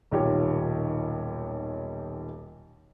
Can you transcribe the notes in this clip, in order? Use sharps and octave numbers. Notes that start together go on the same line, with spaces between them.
D#1 B1 D#3 F4 G4 C#5